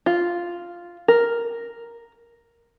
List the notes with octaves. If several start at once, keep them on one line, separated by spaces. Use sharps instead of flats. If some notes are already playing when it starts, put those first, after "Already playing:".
F4
A#4